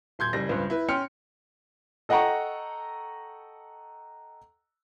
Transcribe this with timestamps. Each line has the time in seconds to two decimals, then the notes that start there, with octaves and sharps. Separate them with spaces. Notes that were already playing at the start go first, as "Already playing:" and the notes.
0.19 D#1 C6 G6 G#6
0.33 F#1 G3 A#6
0.49 C#2 G2 B4 C5
0.70 E4 B4
0.89 C#4 G5 C6 F6 C#7
2.09 A4 D#5 F#5 G5 A#5 C#6